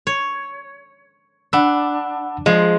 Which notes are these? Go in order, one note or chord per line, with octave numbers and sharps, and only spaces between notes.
C#5
D4 F#5 B5 E6
F3 G#3